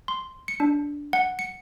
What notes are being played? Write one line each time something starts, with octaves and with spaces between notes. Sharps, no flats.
C6
C#7
D4
F#5
C#7